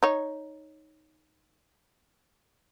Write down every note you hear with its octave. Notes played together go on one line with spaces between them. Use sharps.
D#4 C#5